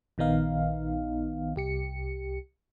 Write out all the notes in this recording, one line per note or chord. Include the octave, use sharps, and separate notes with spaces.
A#1 D#3 B3 D#4 F5
C2 G4 C#7